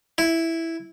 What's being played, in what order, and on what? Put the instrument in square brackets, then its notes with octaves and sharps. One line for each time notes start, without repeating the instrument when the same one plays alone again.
[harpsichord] E4